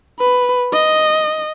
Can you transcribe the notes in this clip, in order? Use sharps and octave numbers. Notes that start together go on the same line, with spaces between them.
B4
D#5